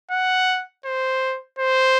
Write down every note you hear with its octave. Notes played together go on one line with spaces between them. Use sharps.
F#5
C5
C5